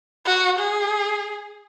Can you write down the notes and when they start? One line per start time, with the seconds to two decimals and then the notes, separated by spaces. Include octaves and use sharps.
0.26 F#4
0.59 G#4